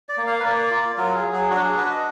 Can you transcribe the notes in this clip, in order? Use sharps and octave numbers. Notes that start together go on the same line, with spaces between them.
D5
A#3
F5
B4
A#3 D5
F4
F#3 A#4
G#4
F#3
G#4
D4 F#4
G#4
F#4 B4
D#5